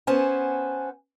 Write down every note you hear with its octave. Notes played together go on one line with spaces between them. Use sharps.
B3 C#4 C5 G#5 A5